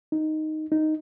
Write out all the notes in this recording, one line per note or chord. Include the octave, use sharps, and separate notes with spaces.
D#4
D#4